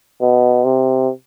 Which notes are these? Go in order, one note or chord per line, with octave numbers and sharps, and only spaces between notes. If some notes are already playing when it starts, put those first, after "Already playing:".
B2
C3